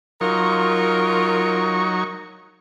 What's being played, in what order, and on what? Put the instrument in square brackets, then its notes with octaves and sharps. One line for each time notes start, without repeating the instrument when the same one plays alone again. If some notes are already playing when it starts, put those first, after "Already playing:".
[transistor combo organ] F#3 D#4 C#6 [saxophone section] F4 A#4